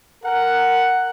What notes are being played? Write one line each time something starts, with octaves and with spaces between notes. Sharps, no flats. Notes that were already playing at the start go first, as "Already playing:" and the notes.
A#4 F#5